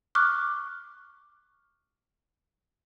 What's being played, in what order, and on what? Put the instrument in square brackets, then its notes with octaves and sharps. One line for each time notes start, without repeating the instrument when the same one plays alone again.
[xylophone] C#6 D6 F6 F#6